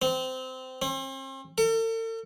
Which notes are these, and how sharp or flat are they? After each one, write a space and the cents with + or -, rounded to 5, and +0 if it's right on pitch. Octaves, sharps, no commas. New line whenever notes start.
C4 -20
C4 +40
A4 +45